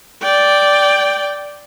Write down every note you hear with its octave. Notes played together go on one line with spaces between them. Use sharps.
D5 G5